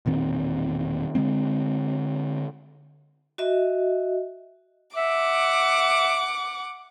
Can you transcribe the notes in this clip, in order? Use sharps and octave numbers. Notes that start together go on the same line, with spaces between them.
E1 A#2 D#3 C4
D3 F3 G#3 C4
F#4 D#5 E5
E5 F#5 D6